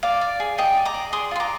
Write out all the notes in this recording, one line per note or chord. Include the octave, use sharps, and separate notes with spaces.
D5 F5
D5
G#4
G#4 D#5 G5
D5
A#5 D6
D5
G#4 C6 D#6
F4 C6
A#5 D6